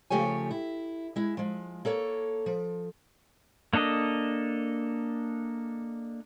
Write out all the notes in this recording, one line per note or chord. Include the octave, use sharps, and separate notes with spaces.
C#3 F3 A3 G4 C#5 G#5
E4
G#3 E4
F3 G#3
A#3 A4 C#5
F3
A#3 D4 A4 D#5